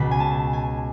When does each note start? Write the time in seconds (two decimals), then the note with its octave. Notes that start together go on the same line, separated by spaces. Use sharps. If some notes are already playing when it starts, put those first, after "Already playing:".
Already playing: C#2 B2 B5
0.11 G#5
0.20 A5
0.53 G#5